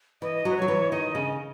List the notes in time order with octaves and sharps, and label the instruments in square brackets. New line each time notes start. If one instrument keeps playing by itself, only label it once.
[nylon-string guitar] E3 [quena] D#5
[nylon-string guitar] F#3 [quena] B4
[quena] C#5
[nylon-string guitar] F#3
E3
[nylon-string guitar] D#3 [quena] D#5
[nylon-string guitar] C#3